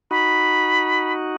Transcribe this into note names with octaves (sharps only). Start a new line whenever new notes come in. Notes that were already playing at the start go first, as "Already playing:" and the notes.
D#4 F#4 B5